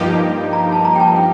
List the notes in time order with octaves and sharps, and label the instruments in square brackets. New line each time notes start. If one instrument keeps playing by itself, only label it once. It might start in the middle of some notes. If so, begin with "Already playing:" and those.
Already playing: [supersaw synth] G2 F3 A#3 D#4 G4
[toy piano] A#5
A5
A#5
G5
A5
G5